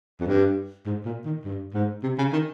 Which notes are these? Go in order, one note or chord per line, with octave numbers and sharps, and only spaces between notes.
F2
G2
G#2
A#2
D#3
G2
G#2
C3
C#3
D#3